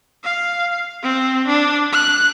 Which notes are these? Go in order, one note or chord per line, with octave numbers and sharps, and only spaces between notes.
F5
C4
D4
F#6